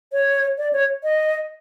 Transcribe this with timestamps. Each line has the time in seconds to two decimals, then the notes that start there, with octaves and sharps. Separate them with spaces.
0.12 C#5
0.58 D5
0.73 C#5
1.04 D#5